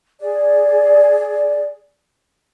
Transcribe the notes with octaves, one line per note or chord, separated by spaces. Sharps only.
G#4 D5